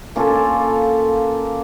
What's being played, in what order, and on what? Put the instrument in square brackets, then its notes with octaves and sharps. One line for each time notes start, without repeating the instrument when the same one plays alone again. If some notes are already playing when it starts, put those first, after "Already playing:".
[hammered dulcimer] A#3 C#4 F4 A4